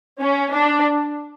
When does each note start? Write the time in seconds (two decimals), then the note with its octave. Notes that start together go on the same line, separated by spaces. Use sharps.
0.20 C#4
0.53 D4